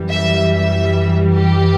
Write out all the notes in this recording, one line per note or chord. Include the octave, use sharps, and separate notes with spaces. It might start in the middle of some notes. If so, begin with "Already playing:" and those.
Already playing: F#2 E3 G3
E5
E5
G4